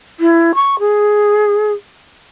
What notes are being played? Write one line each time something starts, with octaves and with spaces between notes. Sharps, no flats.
E4
C#6
G#4